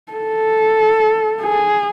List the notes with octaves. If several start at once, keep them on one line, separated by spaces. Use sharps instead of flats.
A4
G#4